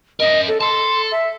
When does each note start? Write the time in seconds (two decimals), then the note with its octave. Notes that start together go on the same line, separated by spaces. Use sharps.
0.20 C#4 A#4 D#5
0.48 A4
0.61 A4 A5 C6
1.12 E5